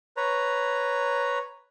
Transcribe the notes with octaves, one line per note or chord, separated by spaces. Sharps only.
B4 C#5 A#5